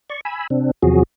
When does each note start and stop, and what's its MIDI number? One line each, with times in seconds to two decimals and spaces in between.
0.10 0.21 74
0.10 0.21 85
0.25 0.47 80
0.25 0.47 83
0.25 0.47 88
0.50 0.71 48
0.50 0.71 60
0.50 0.71 62
0.83 1.03 40
0.83 1.03 48
0.83 1.03 53
0.83 1.03 54
0.83 1.03 66
0.83 1.03 68